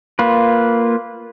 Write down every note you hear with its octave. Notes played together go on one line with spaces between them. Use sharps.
A#3 F4 B4